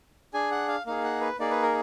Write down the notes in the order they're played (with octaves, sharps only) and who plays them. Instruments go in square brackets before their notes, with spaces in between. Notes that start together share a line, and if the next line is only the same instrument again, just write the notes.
[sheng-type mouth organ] D4 G#4 G#5
F#5
F5
A#3 D#4 G#4 F5
F#5
B4
A#3 D#4 G#4 D5
B4
A#4